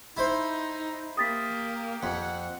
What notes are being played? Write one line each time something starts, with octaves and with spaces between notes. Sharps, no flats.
D#4 E4 C5
A#3 G4 D#6 A6 B6
F2 F#5